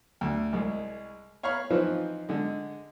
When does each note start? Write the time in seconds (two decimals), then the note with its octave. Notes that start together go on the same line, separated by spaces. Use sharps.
0.21 D2
0.53 C2 G#3
1.43 C#5 F5 A#5 B5 C#6
1.70 E3 F3 C4 D#4 F4 B4
2.29 D3 G#3